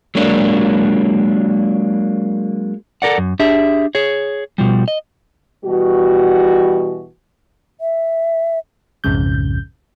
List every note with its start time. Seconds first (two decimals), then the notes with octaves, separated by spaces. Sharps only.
0.15 F#3 G#3 A#3 D4
3.02 A4 A#4 D5 F#5
3.18 F#2
3.39 D4 G4 G#4 E5
3.95 G#4 C#5
4.58 B2 F3 G3
4.88 D#5
5.64 B2 E3 G3 F#4
7.81 E5
9.04 B1 F2 G#2 C#3 G6